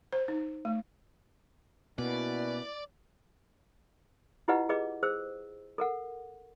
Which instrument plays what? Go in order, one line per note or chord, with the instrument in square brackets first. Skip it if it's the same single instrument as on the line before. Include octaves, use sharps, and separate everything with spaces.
[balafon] C5
D#4
A3
[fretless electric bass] B2 [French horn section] A#3 E4 [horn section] C#4 F#4 B4 [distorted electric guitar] D5
[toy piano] E4 F4 G4 B4 D#5 F#5
G#4 B4 D#5 D6
G#4 C5 E6
A4 A#4 F#5